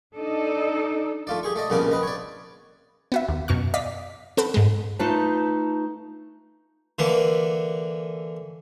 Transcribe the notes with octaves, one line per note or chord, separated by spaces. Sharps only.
D4 D#4 A4 D5 D#5
A3 F4 D5
G4 G#4 C#6
A3 D5 D#5
C2 A#2 C#3 B3 D4 D6
C4 B4 D#5
C#5 D5
B3 F#4 E5
D#2
F#2 B2 C#6 F6
D5 D#5 F5 B6
C4 A4 F#5 B5
G#2 G#3
A3 D#4 F4 B4 A5
D3 E3 A#3